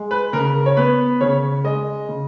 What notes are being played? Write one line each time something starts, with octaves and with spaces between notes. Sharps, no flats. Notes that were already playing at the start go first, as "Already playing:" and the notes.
Already playing: G#3
B4
C#3 A#4
C#5
B3 B4
C#3 C#5
G#3 D#5
C#3